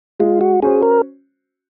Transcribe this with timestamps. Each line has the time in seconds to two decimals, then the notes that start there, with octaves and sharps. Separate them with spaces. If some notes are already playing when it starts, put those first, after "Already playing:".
0.19 G#3 F4
0.41 F#4
0.62 C#4 F#4 G#4 C5
0.82 A#4